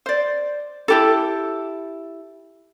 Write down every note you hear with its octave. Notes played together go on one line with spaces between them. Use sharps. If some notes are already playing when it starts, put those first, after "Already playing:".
C5 D5
E4 G4 A4